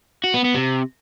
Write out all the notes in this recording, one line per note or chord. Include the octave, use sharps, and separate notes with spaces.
F#4
B3
B3
C3